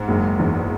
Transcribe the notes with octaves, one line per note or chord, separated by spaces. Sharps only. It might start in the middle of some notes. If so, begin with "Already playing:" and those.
Already playing: G#2
F#1
E2